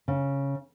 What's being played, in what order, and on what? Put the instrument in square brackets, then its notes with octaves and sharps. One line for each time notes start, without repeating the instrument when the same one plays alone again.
[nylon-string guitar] C#3